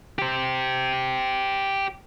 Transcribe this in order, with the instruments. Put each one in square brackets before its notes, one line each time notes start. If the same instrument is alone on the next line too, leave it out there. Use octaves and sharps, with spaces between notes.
[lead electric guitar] G4 C5